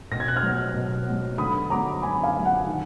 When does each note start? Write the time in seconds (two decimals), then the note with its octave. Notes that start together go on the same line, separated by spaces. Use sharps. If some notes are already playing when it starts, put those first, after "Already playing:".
0.11 B2 A#6
0.20 G#6
0.28 F#6
0.36 F6 G#6
0.43 F#3 B3
0.75 B2
1.06 F#3 B3
1.38 D3 B5 D#6
1.70 F#3 B3 D4 A#5 D6
2.02 D3 G#5 B5
2.23 F5 G#5
2.35 F#3 B3 D4
2.45 F#5
2.67 D#3